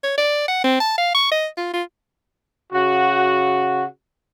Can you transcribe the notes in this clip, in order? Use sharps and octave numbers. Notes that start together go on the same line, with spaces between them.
C#5
D5
F#5
C4
A5
F5
C#6
D#5
F4
F4
C#3 F#4